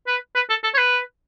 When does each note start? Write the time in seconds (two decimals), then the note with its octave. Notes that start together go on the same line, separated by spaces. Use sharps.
0.07 B4
0.35 B4
0.49 A4
0.64 A4
0.74 C#5
0.78 B4